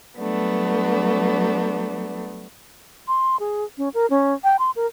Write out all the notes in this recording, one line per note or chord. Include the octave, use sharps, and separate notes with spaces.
F#3 G3 A3 B3 D4
C6
G#4
C#4
A#4
C#4
G5
C6
A#4